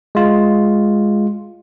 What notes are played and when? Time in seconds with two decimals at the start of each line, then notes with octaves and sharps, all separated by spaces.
0.15 G#3 F4